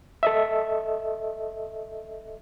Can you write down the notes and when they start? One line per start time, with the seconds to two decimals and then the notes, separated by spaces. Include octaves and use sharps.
0.23 A4 D#5 E5